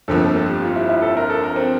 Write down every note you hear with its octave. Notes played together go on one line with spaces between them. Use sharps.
G1 F2 D3 F3 A#3 A4
A4
A4
G4
F4
E4
E4
A4
A#4
A4
A#4
C4